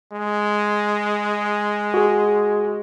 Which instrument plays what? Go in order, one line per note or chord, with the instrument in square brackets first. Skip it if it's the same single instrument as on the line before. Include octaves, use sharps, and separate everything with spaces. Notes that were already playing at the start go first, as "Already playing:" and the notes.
[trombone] G#3
[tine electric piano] F#4 G#4